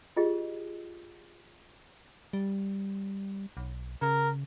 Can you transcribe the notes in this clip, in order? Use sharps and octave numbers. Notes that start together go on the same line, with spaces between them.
F4 G4 G#4 D#5
G3
B1
C#3 A#4